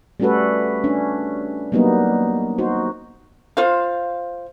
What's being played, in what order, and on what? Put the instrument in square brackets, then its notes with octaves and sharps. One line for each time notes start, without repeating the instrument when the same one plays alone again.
[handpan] G3 A3 C#4 F#4 A4 B4
C#4 D4
F#3 G3 A#3 B3 D#4
D#4 F#4 C5
[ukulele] F4 C5 F5